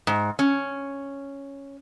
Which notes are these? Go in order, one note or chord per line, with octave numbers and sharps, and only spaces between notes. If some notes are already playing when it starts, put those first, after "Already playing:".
G#2
C#4